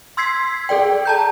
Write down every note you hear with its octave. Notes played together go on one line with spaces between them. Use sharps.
C6 E6 G#6 B6 C7
G#4 A4 D5 G5
A5 A#5 G6